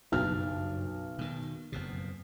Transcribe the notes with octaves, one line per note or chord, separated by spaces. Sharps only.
F#1 B1 G2 F6
B2 D#3
F#1 F2 B2